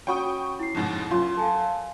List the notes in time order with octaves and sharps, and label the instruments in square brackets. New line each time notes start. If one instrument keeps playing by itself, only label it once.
[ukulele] C#4 F#4 B5 [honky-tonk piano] G5 C#6 D#6
[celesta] E4 C7
[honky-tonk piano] F2 G#2 B2
[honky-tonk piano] F#2 C6 [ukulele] F4
[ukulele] A4 [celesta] F5 G#5 A5